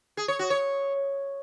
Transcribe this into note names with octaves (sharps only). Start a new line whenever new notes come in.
G#4
C#5
F#4
C#5